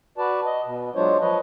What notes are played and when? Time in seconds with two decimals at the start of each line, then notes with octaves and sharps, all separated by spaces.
0.18 F#4 B4 D5 A5
0.46 D#5
0.65 B2
0.95 F#3 G#3 D4 F4 C5 C#5
1.21 F3 B4 C#5 D#5